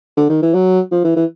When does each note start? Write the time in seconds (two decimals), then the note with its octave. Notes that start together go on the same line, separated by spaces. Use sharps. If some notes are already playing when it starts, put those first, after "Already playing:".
0.17 D3
0.29 D#3
0.42 E3
0.54 F#3
0.92 F3
1.04 E3
1.16 E3